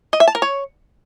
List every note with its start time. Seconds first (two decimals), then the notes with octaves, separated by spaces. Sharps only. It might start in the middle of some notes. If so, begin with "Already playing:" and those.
0.13 D#5
0.20 E5
0.28 A5
0.35 A#4
0.42 C#5